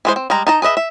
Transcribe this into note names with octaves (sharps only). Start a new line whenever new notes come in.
E3 G#3 C5
C4
G3 G#3 A#5
D#4 A5 A#5
G#4 B4 D#5 E5
E5